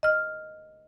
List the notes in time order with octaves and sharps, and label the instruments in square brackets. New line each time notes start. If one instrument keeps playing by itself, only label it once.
[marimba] D#5 F6